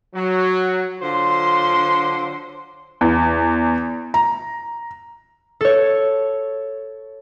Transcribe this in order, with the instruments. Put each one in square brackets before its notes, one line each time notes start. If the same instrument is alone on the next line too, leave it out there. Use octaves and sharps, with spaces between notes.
[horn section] F#3
D3 F#3 F4 C5 C6
[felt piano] E2
A#5
[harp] A4 C#5